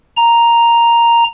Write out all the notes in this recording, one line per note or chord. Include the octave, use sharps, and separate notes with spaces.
A#5